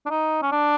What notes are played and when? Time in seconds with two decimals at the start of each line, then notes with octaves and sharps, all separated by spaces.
0.06 D4
0.10 D#4
0.43 C#4
0.52 D4